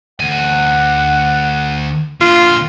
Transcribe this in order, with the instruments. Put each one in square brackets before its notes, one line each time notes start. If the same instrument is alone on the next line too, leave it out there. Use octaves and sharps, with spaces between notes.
[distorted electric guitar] D2 G#5 [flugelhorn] F#5
[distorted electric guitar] A#2 D3 [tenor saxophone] F4